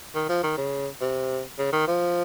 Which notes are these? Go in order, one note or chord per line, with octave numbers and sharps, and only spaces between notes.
D#3
F3
D#3
C#3
C3
C#3
D#3
F3